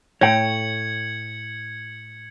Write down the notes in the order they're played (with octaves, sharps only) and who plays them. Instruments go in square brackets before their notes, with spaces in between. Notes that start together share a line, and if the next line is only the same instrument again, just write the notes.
[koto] A2 [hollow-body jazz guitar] C#5 G5 [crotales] G#6 C#7 F#7